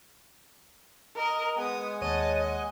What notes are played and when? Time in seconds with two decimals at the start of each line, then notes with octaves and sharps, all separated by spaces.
1.16 A#4 D#5
1.57 G#3 B3 F#5 G#5 D#6
2.01 D#2 C#5 D#5 A5 D#7
2.37 D#5